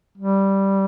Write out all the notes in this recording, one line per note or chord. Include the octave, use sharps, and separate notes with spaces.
G3